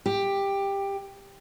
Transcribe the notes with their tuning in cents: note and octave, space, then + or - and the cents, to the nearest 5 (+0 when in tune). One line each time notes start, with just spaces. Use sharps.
G4 +10